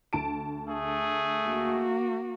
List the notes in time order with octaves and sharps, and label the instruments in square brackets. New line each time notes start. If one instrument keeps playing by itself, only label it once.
[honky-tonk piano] D2 A5 D7
[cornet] A3 [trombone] G#4
[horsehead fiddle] A#3 F#4